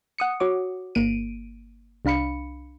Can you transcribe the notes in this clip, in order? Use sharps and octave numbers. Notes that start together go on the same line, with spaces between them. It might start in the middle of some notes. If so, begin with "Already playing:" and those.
F#5 D#6 C#7
F#4 C#5 D6
G1 A#3 D7 D#7
C2 D4 F5 B5 C#7